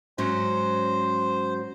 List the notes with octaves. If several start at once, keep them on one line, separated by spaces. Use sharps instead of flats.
G#2 F#3 C#4 C5